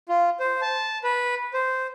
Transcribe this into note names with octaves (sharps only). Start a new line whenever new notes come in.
F4
C5
A5
B4
C5